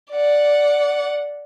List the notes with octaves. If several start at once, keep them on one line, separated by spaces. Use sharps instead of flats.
D5 F#5